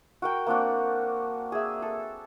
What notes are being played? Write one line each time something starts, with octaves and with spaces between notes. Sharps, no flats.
F#4 A#4 G5
A#3 C4 D4 F#4
G#4 E5
A4